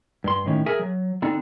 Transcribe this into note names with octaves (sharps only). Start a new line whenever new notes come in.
G2 C6
A2 D#3 C#4
G#4 A#4 E5 G#5
F#3
D3 C4 D4 D#4